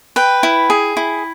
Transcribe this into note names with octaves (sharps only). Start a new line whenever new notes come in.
B4 G5
E4
G#4
E4